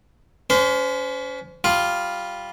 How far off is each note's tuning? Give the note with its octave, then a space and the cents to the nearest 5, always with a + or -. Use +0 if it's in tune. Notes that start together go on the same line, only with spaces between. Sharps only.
C#4 +30 C5 -30
G3 +0 F4 +0